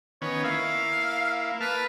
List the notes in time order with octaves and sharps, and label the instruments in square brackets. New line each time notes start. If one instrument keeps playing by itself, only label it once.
[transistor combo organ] D#3 B3 C#4 [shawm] C#5
[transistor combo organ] A#3 E4 [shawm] F5
[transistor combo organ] A#3 A5 F6 [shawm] B4